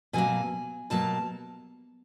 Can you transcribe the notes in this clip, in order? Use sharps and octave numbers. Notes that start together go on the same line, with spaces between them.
B2 F#3 A#3 G#5
B2 F#3 A#3 A5